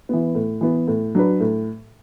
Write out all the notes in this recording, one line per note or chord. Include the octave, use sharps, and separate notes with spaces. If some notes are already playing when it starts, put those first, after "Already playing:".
E3 B3
A2
E3 B3
A2
F#3 D4 B4
A2